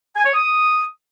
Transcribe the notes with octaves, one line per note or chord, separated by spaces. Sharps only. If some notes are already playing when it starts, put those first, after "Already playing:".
G#5
C#5
D#6